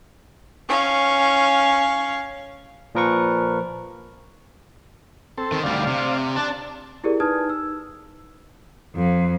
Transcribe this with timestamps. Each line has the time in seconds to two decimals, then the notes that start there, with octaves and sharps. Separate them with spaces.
0.69 C#4 F5
2.95 A#2 F3 A#4 B4 C#6
5.38 C4 A4
5.52 D#3
5.64 D2 G3 D5 F5
5.87 C3
6.36 D4 D5 A5
7.04 E4 G4 G#4 A#4 D5
7.20 D#4 B4 A5 D#6 F6 G#6
7.49 E6
8.96 F2